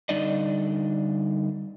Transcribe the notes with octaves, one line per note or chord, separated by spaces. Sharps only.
D3 G3 D#4 D5 D#5